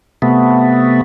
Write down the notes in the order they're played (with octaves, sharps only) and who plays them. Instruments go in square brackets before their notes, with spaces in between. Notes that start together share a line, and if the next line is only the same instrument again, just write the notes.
[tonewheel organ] C3 A3 B3